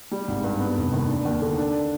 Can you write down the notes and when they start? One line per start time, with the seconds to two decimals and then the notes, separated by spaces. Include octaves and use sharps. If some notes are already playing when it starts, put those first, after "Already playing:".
0.11 G3
0.28 G#1
0.44 G2
0.60 B3
0.76 F1
0.93 D#2
1.09 D4
1.25 D#2
1.42 D3
1.57 D4